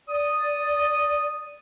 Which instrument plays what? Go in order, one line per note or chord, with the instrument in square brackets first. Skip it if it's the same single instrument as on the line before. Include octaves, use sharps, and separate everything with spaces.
[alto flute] D5 [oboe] D#6